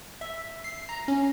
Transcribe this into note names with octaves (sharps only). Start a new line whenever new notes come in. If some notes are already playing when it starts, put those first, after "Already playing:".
E5
C7
A#5
C#4